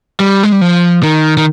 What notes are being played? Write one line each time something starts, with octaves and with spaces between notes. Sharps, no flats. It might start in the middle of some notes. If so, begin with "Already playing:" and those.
G3
G#3
G3
F3
D#3
D#3